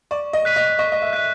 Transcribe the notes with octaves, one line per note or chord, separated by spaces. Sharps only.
D5 C#6
D#5
F#6 B6 D#7
D#5
D#5 C#6
D#5
E5
E5 F#6 B6 D#7